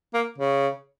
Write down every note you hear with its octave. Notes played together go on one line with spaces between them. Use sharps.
A#3
C#3